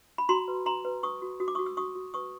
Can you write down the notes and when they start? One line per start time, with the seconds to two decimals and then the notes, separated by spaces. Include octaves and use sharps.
0.18 B5
0.29 F#4 A#5 C6
0.48 B4
0.65 F#4 A#5 C6
0.85 B4
1.03 B4 C#6 D#6
1.22 F#4
1.40 F#4 D#6
1.48 D6
1.55 F#4 C#6 D#6
1.66 E6
1.77 F#4 C#6 D#6
1.95 F#4
2.14 B4 C#6 D#6